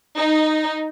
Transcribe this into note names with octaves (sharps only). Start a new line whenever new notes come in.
D#4